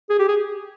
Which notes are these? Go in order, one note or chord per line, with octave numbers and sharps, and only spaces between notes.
G#4
G4
G#4